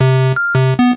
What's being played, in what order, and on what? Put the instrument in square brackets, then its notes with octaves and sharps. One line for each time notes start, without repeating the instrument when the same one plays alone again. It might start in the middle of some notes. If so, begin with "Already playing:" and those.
[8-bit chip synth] C3
F6
C3
B3